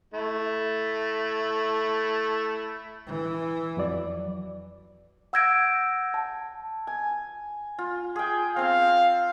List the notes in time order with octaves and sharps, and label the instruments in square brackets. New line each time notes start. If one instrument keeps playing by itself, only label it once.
[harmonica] A3 E4
[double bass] E3
[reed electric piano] F2 F#3 D5
[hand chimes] F#5 E6 G6 G#6 A#6 D7
A5
[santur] G#5
F4
G#4 G5
[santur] C4 C5 A5 [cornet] F5